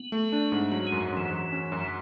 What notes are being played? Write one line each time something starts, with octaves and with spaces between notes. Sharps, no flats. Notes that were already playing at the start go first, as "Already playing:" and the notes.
Already playing: B3
A3
D4
G#2
F#3 B3
G#3
F#2
F#2 E3
F#3
C#4
F#2